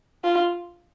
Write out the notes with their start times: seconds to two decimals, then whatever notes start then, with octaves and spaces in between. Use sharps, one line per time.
0.24 F4